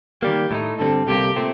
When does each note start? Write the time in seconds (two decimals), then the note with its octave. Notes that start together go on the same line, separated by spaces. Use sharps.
0.22 D#3 G3 A#3 G4
0.51 A2 A3 D#4
0.79 G2 D3 G3 C4 A4
1.07 C2 C3 G3 A#3 G4
1.36 A#2 A3 C4